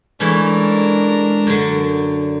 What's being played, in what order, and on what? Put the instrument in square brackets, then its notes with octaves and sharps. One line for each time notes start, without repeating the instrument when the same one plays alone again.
[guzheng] E3 A3 C#4 [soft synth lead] G#3 [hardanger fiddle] D4 A#4
[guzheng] F#2 D3